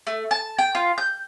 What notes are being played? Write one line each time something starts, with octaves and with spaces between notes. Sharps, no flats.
A3
A5
G5
F4
G6